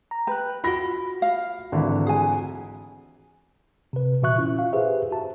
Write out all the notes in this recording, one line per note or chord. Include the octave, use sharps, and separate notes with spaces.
A#5
B4 G5 F#6
F4 F#4 B5 A#6
F5
G#1 D3 E3
G#4 G#5
C3 B4
A#2 E3 F#4 E5 C#6 F#6
C#4 E4 F4
F5
G4 G#4 B4 C5 E5
F#4 A5